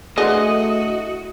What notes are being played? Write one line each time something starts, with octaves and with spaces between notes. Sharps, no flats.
D3 E3 A3 F#4 G#4 D#5